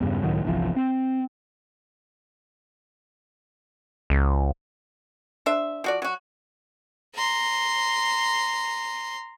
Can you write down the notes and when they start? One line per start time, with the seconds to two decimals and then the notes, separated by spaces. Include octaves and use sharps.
0.01 E2 G2 C#3
0.23 C#2 A2 D#3 F#3
0.45 G1 C2 E3 F3
0.76 C4
4.10 C#2
5.46 D4 C5 E5
5.84 F3 F#4 D5
6.02 F#3 F#4
7.15 A#5 C6